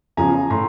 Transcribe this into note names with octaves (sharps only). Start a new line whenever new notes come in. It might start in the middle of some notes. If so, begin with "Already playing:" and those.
E2 C#3 F3 G#5 A#5
A2 A#5 C6